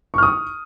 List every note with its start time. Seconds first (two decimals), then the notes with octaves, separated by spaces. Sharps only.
0.14 C#6
0.18 F6
0.23 D#6